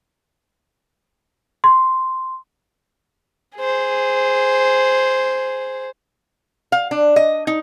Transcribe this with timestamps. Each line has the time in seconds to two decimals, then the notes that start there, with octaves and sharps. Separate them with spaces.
1.64 C6
3.57 G#4 C5
6.72 F5
6.91 D4
7.16 D#5
7.47 D#4